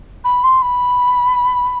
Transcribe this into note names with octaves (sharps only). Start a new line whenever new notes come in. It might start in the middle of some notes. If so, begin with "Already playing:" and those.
B5
C6
B5